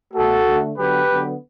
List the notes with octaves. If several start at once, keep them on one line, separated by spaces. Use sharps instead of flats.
B2 A3 F#4 A4
D3 A3
D3 F#3 B3 G4 B4
D3 F#3 B3